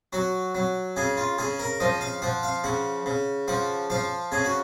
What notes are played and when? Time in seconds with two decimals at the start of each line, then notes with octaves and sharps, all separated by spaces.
0.13 F#3 F#4
0.55 F#3
0.96 C#3 G#4
1.17 F4
1.38 C#3 G#4
1.59 A#4
1.80 F3 D#5
2.01 F5
2.22 F3 F#5
2.43 F5
2.64 C#3 F#5
3.06 C#3
3.48 F3 F#5
3.90 F3 F5
4.32 C#3 G#4
4.45 F#4